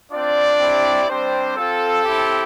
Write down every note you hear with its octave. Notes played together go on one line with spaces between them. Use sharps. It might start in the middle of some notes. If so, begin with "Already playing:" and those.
C4 D4 F4 D5
C4 E4 G4
G3 C4 D4 G4 C5
C4 F4 A4
C4 E4 G4